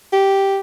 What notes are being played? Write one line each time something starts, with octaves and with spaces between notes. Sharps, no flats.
G4